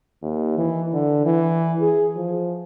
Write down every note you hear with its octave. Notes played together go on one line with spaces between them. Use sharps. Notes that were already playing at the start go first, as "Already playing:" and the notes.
D#2
E3
D3
E3
G#4
F3